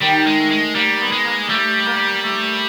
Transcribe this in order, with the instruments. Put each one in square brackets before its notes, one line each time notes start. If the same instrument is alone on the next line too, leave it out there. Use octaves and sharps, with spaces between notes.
[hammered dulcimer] D#3 [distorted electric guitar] G3
[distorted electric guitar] G#3
[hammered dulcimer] A3
[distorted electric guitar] G#3
[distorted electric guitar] G3 [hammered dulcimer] A#3
[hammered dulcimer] B3
[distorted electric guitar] G#3
[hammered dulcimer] A#3
[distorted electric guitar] G3 [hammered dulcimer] A3
[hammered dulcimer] A#3
A3